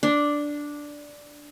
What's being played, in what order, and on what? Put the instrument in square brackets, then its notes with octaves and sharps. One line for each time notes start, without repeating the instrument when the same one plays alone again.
[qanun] D4